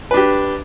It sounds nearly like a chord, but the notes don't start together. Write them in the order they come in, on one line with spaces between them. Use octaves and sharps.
B4 D4 G4